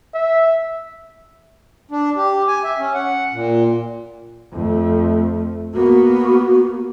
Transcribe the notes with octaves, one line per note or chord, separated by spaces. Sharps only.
E5
D4
G4
G#5
E5
C#4
F#5
A#2
F2 A3
A#3 B3 F#4